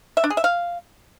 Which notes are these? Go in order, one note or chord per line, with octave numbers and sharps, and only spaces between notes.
E5
D4
G#4
E5
F5